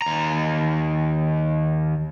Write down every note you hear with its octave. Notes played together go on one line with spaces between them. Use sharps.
D#2 A#5